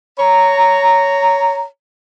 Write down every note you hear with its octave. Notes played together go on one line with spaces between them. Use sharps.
C#5 A#5